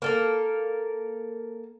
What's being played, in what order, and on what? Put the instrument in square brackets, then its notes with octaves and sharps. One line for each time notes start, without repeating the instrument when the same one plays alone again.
[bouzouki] A#3 A4 A#4